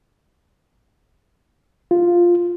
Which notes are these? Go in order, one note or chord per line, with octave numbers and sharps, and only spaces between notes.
F4